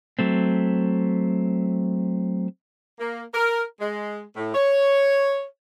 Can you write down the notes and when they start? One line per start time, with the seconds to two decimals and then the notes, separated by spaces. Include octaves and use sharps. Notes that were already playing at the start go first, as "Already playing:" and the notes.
0.19 F#3 A3 C4
2.99 A#3
3.34 A#4
3.80 G#3
4.36 A2
4.54 C#5